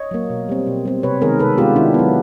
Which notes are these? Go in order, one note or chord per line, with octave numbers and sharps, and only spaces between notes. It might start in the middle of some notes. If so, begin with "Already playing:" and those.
Already playing: C#5 D#5
F#3 A#3
B2
G3 C4
B2
G3 C4
C3 B4 C#5
D#3 G#3 B3 G#4 A#4
C3 A4 B4
D#3 G#3 B3 F4 G4
D#3 D4 E4
F#3 B3